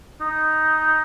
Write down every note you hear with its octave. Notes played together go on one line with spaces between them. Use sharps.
D#4